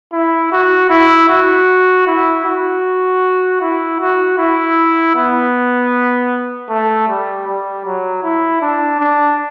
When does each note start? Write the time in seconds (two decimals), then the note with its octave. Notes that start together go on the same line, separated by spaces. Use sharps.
0.13 E4
0.52 F#4
0.90 E4
1.29 F#4
2.07 E4
2.45 F#4
3.61 E4
4.00 F#4
4.38 E4
5.16 B3
6.70 A3
7.08 G3
7.47 G3
7.85 F#3
8.23 E4
8.62 D4
9.00 D4